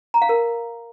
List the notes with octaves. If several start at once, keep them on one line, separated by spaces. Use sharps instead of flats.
A#5
F5
A#4